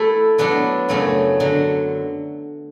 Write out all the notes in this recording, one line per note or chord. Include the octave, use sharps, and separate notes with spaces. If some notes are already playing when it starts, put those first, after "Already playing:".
Already playing: A3 E4 A4
F#3 B3 D4 A4
F#2 C#3 F#3 A3 C#4
D3 F#3